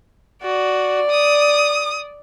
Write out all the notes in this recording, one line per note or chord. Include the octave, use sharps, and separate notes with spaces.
F#4 D5
D#6